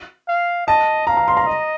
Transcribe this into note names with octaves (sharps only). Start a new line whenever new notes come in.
F5
D#5 A5
F5 A#5
A#5
C6
A#5
D#5